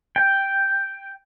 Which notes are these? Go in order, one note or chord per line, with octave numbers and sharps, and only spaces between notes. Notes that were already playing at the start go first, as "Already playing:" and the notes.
G5